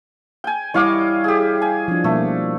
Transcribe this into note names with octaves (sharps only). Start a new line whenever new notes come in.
G5 G#5
G3 E4 C#5 D#5 F5 D6
G4 G#4
G#5
F3 D4
B2 G3 A3 A#3